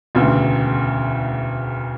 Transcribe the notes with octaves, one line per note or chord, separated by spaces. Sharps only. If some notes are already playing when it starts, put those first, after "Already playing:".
E1 D2 C#3 E3